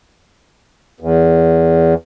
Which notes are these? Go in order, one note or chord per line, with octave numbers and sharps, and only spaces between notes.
E2